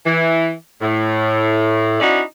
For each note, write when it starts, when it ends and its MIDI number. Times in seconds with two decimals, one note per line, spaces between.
0.05 0.52 52
0.81 1.99 45
2.00 2.21 61
2.00 2.21 63
2.00 2.21 64
2.00 2.21 66
2.00 2.21 74